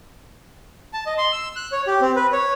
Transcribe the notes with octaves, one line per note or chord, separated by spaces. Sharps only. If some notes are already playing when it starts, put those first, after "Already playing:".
A5
D#5
C6
E6
F#6
C#5
G4
C4
B4
C#5